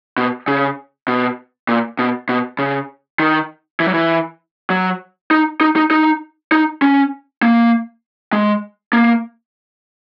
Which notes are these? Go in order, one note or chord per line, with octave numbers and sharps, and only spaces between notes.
B2
C#3
B2
A#2
B2
B2
C#3
D#3
E3
F#3
E3
F#3
D#4
D#4
D#4
D#4
D#4
C#4
A#3
G#3
A#3